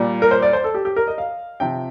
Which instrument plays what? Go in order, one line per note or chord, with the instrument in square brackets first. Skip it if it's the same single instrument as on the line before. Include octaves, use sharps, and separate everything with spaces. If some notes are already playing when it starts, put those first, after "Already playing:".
Already playing: [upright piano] A#2 G3
A#4
C5
D5
C5
A4
G4
G4
A#4
D#5
F5
C3 F3 G5